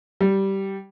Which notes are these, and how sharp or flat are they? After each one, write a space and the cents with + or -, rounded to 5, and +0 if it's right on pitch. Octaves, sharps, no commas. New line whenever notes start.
G3 -10